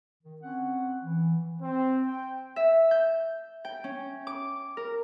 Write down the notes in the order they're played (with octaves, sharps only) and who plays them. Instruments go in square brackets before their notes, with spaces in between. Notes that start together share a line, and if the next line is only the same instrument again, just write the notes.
[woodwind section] D#3
C4 C#4 F#5
E3
[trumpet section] C4
G5
[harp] E5
G6
G5
C#4
D6
A#4